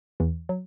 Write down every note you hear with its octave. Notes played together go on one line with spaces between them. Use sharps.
E2 E3
F#3